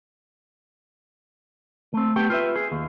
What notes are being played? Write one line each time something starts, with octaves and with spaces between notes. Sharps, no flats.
A3 C4
A3 B3 G4 G5
F4 B4 E5
G#4
D#2